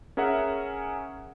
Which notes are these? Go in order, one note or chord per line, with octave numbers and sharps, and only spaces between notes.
C#4 G#4 A#4 E5 F#5